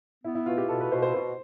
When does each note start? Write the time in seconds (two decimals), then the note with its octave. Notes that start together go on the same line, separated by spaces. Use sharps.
0.24 B3 E4
0.35 E4
0.46 B2 F4
0.58 G4
0.69 B2 A4
0.81 B4
0.92 B2 C5
1.02 C5
1.14 B2 C5